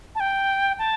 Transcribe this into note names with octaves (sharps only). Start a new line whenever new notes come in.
A5
G5
A5